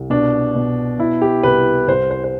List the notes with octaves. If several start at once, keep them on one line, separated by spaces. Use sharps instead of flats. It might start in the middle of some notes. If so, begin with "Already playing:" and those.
Already playing: C2
B2 D4
B2
B2 E4
G4
C2 B4
C2 C5
C5
C5